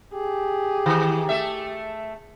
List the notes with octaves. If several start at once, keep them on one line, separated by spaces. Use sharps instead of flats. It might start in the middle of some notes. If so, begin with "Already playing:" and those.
G4 G#4
D#3
A3 E5